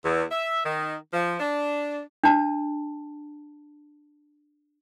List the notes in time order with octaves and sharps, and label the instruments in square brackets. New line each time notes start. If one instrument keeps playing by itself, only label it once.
[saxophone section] E2
E5
D#3
F3
D4
[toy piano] D4 A5